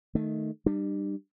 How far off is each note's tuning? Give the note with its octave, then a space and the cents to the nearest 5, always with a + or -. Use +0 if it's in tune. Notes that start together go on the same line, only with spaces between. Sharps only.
D#3 +0 A3 +0
G3 +0 D4 +40